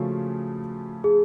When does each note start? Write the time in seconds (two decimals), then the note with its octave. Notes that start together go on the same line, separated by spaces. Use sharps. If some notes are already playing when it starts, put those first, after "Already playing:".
Already playing: C#3 F3 A3 C#4 F4 F#4
1.04 G#4